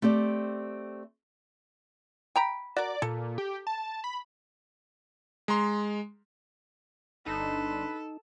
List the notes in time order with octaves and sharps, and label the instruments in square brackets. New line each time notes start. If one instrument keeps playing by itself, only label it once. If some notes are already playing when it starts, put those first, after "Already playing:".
[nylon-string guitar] A3 C4 G4 D5
[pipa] G5 A#5 B5
[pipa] F#4 A#4 [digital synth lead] D5
[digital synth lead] A#2 [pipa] A4
[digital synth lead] G4
A5
B5
[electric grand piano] G#3 A#5 C6
[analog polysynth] G1 D4 C6 [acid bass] D#4 [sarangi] A4 [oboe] B4